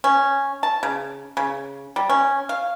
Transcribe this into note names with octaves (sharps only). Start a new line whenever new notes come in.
C#4
A5
C#3
C#3
G3
C#4
F5